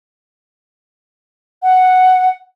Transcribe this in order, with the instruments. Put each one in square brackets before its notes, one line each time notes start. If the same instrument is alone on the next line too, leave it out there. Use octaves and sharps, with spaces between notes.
[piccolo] F#5